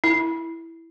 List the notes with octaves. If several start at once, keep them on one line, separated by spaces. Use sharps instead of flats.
E4